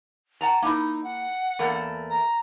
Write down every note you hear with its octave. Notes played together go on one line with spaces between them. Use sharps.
F#5 A5 A#5
A#3 D#4 E4
F#5
E2 A3 A#3
A#5